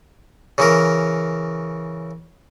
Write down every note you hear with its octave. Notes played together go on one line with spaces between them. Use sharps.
C#3 E3 A#4